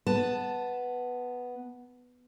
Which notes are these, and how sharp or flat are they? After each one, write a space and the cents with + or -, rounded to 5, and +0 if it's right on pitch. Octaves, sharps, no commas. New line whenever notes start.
B3 +0 A5 +0